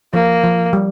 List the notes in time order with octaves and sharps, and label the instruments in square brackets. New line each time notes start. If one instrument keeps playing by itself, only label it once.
[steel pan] F3 [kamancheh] A#3
[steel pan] F3
G3